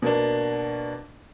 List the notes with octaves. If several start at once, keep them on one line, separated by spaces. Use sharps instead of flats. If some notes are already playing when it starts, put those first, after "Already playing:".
B2 A#3 D4